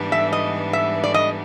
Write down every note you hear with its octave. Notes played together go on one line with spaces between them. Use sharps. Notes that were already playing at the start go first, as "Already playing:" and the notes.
Already playing: G#2 E3 G3 B3 D4
E5
D#5
E5
D5
D#5